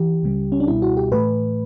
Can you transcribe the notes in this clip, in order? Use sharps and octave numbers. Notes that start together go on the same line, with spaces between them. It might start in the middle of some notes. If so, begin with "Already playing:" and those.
Already playing: E3 G4
C#2 C#3 G3
C#4
D4
C#2 B2 G3 E4
F#4
G4
A2 E3 A3 B4